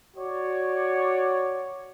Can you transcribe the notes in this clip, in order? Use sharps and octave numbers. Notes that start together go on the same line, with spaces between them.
F#4 C#5 D5